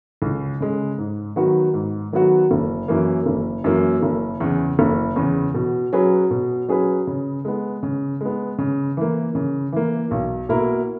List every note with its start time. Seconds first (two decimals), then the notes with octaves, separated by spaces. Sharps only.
0.22 C#2
0.60 C#3 G#3
0.98 G#2
1.36 D#3 F#3 B3 F#4
1.74 G#2
2.13 D#3 F#3 B3 F#4
2.51 F#1
2.88 F#2 E3 A#3
3.26 F#1
3.64 F#2 E3 A#3
4.03 F#1
4.40 E2 C#3
4.79 F#1
5.16 E2 C#3
5.54 B2
5.93 F#3 C#4 G#4 B4
6.31 B2
6.68 F#3 C#4 G#4 B4
7.07 C#3
7.45 G#3 B3
7.83 C#3
8.21 G#3 B3
8.58 C#3
8.97 E3 A#3
9.35 C#3
9.72 E3 A#3
10.11 B1
10.49 B2 A#3 E4 A#4